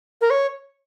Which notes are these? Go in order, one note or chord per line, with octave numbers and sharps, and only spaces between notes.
A#4
C#5